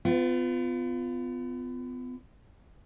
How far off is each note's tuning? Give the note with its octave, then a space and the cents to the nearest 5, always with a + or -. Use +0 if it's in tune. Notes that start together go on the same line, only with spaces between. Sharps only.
B3 +35 F4 -5